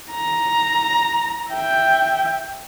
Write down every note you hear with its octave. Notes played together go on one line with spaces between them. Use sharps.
A#5
E5 G5